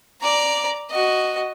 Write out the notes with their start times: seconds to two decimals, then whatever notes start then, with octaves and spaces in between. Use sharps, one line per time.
0.21 D5 A#5
0.90 F#4 D#5